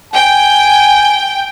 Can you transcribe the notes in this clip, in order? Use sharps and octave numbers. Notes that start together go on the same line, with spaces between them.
G5 G#5